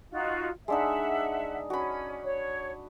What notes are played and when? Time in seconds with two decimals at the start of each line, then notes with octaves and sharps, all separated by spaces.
0.11 D#4 F4 F#4
0.68 G#3 D4 D#4 E5 F#5
1.70 C#4 F#4 B5
2.24 C#5